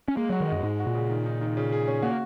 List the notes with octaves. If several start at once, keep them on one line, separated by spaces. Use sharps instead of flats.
C#4
G#3 A#3
F#3 F#4
D#3
F#2 D#5
G#2 G#3
F#4
A#2
C#3
D#3
D#4
D#3
C#3
G#4
C#4
A#3 F#4